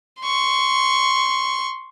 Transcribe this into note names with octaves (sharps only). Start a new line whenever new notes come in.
C6 C#6